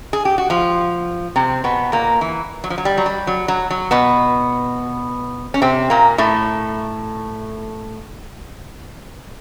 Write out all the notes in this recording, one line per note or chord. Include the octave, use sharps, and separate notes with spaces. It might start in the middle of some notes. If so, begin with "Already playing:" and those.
G#4
G4
F#4
F3 F4
C3 C4
B2 B3
A#2 A#3
E3
F#3
F3
F#3
G3
F#3
G3
F#3
F#3
F#3
B2 B3
C#4
C3 C4
A#2 A#3
A2 A3